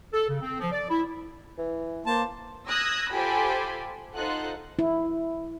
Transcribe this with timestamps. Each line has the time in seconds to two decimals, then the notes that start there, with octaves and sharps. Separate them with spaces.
0.14 A4
0.29 C#3
0.41 C4
0.60 F3
0.72 D5
0.90 E4
1.58 E3
2.06 A#3 C5 A5
2.70 D#6 E6 F#6 G#6 A#6
3.13 F4 G4 A4 C5 G#5 B5
4.15 D#4 F4 A4 C5 F#5 F#6
4.79 E4